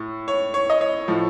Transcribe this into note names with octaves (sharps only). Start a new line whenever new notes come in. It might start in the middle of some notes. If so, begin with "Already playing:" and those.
Already playing: A2
C#5
C#5
D#5
C#5
A2 F3